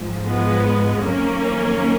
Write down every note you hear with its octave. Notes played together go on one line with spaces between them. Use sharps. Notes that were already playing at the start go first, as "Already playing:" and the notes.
Already playing: G#2 F3
G#3 B3
F2 D#3 F#3 A#3 C#4